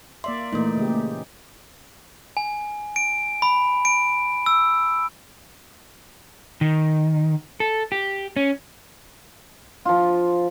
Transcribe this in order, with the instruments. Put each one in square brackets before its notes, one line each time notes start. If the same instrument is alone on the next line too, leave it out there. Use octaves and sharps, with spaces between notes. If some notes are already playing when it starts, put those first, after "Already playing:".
[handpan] A#3 D5 E5 [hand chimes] C6
[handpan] A#2 E3 D#4 [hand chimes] A3 A#3
[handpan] C#3 G#3 G4
[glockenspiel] G#5
D7
B5
D7
E6
[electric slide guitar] D#3
A4
G4
C#4
[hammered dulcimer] F3 F4